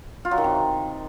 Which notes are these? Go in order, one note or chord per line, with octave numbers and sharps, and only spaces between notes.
F4
F#3
D#3
C3